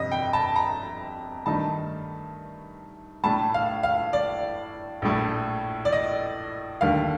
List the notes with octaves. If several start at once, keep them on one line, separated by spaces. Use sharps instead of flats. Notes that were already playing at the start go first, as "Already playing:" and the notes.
Already playing: G1 F2 C3 D#5
G5
A5
A#5
G2 D#3 A3 D#4 A5
A2 A3 D4 A5
F5
F5
D5
A#1 A2 A3
D5
D#5
D#2 D3 A3 F5